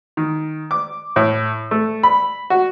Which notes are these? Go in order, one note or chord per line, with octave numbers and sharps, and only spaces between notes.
D#3
D6
A2
A3
B5
F#4